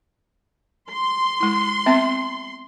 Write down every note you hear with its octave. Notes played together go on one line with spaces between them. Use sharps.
C6
G#3 E4
B3 C4 E5